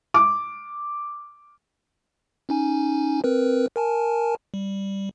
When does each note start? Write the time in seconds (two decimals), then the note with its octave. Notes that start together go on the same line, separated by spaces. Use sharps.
0.14 D6
2.49 C#4 D#4 G#5
3.24 C4 A#4 B4
3.76 A#4 G#5 A5
4.54 G3